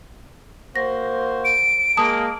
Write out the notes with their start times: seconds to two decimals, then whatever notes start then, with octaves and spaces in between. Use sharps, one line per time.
0.76 A#3 F#4 C5 A#6
1.45 D7
1.97 G#3 A#3 A5 D#6